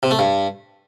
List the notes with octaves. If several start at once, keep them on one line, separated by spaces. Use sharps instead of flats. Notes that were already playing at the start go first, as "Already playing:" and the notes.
C3
A3
G2